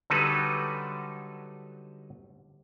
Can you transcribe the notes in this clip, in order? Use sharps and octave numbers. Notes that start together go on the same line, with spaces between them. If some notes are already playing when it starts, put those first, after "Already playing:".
D3 F#3 G3 D#4 A4 B4